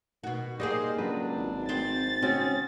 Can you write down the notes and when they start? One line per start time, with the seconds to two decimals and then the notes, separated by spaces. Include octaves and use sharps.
0.24 B2 D#3 F#4
0.60 G3 A#3 G#4 C5 D#5
0.98 C#2 F#3 D4 B4
1.36 G#1
1.69 C4 C5 A6
2.22 C#3 C4 C#4 F#4